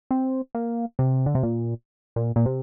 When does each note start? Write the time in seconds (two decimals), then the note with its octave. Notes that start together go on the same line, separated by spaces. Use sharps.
0.11 C4
0.55 A#3
0.99 C3
1.26 D3
1.35 C3
1.43 A#2
2.16 A#2
2.36 A#2
2.46 C3